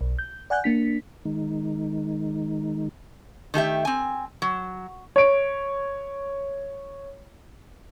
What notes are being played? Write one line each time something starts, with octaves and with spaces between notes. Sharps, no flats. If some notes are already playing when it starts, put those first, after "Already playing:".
B1
G6
D5 F#5 G#5 F#6 G6
A#3 D4 B6
D#3 G#3 D#4
D#3 A3 G4 E5
C4 G#5
F#3
C#5 D7